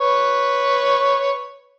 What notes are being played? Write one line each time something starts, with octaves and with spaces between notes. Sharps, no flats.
B4 C#5